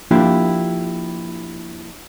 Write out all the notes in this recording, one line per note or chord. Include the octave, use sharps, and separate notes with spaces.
F3 A#3 D4 E4 F4 G4